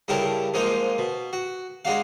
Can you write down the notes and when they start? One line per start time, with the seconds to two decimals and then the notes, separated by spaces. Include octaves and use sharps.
0.08 G2 C#3 E4 G4 A4 A#4
0.54 G#2 F3 G#3 A#3 D#4
0.98 B2
1.33 F#4
1.85 G#3 D4 F#4 F5